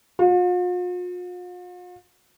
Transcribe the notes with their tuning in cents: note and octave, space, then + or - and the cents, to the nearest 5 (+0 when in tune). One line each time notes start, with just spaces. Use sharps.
F4 +45